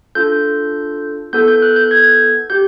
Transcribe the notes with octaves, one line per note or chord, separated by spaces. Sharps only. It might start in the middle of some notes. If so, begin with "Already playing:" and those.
D4 F4 A4 G6
B3 E4 A4 G6
G6
F#6
G6
G#6
G4 G6